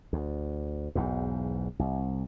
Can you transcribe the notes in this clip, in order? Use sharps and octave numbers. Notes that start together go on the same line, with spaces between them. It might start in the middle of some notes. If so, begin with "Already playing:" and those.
D2
B1 E2 G#2
C2